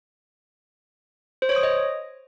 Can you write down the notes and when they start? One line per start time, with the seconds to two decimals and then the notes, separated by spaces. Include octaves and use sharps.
1.42 C5
1.49 C#5
1.56 D#6
1.63 D#5